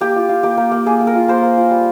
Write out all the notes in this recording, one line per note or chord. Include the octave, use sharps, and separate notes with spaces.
A#3 G4
F4
F4
A#3 G4
A#3
A#3
A#3 G#4
A#3
A#4
F4
A#3 C5
A#3
F4
G3